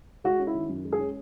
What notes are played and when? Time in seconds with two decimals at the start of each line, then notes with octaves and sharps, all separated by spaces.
0.24 G#3 F#4
0.39 C#4
0.47 E4
0.54 D#3
0.69 F#2
0.85 G#3
0.92 G#4
0.99 C#4